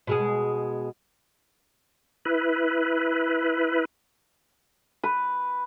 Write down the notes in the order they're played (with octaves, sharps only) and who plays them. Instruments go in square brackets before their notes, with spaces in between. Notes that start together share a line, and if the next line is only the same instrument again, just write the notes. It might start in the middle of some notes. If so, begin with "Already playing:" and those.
[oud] B2 G#3 G#4
[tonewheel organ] E4 B4
[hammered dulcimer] B4